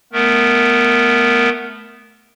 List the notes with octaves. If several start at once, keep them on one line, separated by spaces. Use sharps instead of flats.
A3 B3 A#4